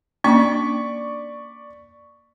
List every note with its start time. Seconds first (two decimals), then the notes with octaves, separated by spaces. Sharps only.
0.24 A#3 C#4 D4 D5 C#6 B6